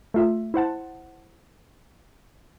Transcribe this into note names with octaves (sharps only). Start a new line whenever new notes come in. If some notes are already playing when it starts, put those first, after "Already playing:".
A3 F4 E5
E4 C5 F#5 A5